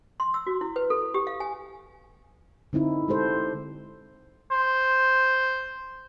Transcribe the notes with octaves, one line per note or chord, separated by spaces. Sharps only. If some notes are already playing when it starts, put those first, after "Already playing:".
C6
E6
F#4
E4
B4
A4
G4
F5
G#5
D3 C4 D#4 E4
G#3 G4 A4 C5
C5